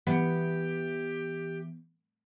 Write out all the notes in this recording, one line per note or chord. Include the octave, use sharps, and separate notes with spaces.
E3 B3 G4